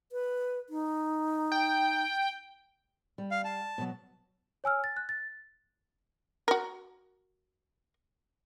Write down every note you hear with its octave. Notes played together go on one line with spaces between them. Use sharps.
B4
D#4
G5
G3
F5
A5
B2 F#3
C#5 G#5 E6 F6
A6
F#6
A6
F#4 A#4